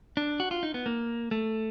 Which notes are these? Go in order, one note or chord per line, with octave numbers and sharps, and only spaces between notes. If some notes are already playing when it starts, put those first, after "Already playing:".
D4
F#4
F4
D#4
B3
A#3
A3